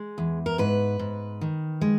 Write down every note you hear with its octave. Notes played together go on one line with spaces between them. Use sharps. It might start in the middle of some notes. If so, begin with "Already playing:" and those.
Already playing: G#3
E2
A#4
G#2 B4
G#2
D#3
G#3